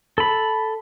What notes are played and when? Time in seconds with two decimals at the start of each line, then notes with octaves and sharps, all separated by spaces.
0.18 A4 B5